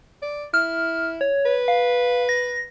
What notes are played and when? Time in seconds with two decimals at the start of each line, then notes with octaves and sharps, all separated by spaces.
0.22 D5
0.54 E4 F6
1.21 C#5
1.45 B4
1.68 F5
2.29 A#6